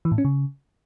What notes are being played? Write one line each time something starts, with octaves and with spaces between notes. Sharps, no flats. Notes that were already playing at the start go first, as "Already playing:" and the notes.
E3
A2
C#4
C#3